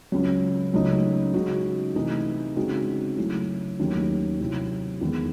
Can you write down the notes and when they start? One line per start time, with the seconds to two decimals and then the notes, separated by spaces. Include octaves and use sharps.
0.12 C#2 C#3 F#3
0.73 C#2 C#3 F#3 A3 D#4
1.34 C#3 G#3 D#4 F#4
1.95 C3 E3 A3 D#4
2.56 C#3 G#3 C4 D#4 F#4
3.17 C#3 F#3 A3 C#4 E4
3.79 D#2 D#3 F#3 A3 C#4
4.40 C3 F#3 C4 E4
5.01 E2 D#3 G#3